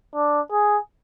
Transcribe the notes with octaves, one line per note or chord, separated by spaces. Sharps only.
D4
G#4